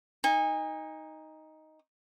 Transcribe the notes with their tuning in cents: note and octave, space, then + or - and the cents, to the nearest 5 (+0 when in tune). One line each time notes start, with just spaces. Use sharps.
D#4 +5 G#5 -35